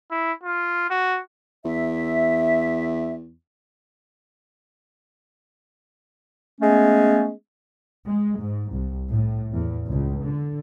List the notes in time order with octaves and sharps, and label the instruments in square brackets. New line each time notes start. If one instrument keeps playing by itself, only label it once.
[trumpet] E4
F4
F#4
[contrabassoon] E2 [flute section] E5
[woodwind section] G#3 A3 B3 C#4
[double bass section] G#3
G#2
C2
A2
E2
C#2
D3